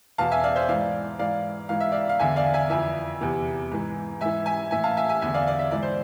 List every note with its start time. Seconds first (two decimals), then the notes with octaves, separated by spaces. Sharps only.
0.18 E2 B2 F5 A5
0.31 E5 G#5
0.44 D5 F5
0.56 C5 E5
0.68 G#2 E3 D5 F5
1.19 G#2 E3 D5 F5
1.69 G#2 E3 F5
1.80 E5
1.92 D5 F5
2.09 F5
2.19 E2 D3 E5 G#5
2.36 D5 F5
2.53 E5 G#5
2.70 F2 E3 E5 G#5
3.21 E2 C3 E3
3.71 G#2 E3
4.21 G#2 E3 E5 G#5
4.46 E5 G#5
4.71 A2 E3 E5 G#5
4.84 F5 A5
4.97 E5 G#5
5.09 E5 G#5
5.21 E2 D3 E5 G#5
5.34 D5 F5
5.47 D5 F5
5.59 E5
5.71 G#2 E3 D5
5.83 C5